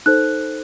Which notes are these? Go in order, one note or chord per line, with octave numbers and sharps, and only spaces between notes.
D#4 A4 C5 F#6